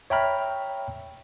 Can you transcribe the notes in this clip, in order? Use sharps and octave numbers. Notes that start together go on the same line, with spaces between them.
C#5 E5 G5 A#5 B5 F6